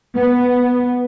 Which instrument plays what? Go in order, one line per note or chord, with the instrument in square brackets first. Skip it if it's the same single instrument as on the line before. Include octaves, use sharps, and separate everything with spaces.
[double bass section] B3